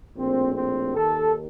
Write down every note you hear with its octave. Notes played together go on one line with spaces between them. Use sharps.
A#1 A2 C4
C4
D#2 D#3 A4